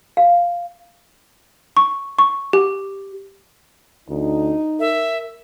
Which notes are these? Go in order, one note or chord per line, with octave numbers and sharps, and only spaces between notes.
F5
C#6
C#6
G4
D2 D#4
A#4 E5